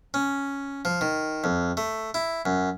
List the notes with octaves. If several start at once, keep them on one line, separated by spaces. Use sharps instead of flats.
C#4
F3
D#3
F2
A3
E4
F#2